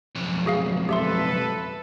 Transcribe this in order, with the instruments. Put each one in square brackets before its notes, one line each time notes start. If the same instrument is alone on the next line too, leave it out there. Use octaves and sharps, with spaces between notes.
[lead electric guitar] B1 F2
[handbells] F#4 G#4 F5
[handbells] G4 E5 C6 [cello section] A4 B4